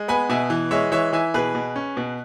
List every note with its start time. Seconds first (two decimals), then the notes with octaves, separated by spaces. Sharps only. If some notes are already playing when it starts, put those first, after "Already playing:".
Already playing: G#3
0.08 B3 G#5 B5
0.29 B2 E5 G#5
0.50 E3
0.71 G#3 C#5 E5
0.92 E3 C#5 E5
1.13 E3 E5 G#5
1.34 B2 G#4 B4
1.55 B2
1.76 C#4
1.97 B2